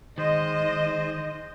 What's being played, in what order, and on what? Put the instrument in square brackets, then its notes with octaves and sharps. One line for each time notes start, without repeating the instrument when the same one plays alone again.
[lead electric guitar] D#3 [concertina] G#3 C5 [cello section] D#5